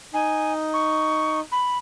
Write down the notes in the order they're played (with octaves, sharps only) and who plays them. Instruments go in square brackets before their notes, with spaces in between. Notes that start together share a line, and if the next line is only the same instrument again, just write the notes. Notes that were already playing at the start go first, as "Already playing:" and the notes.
[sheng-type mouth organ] D#4 [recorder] G#5
[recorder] C#6
B5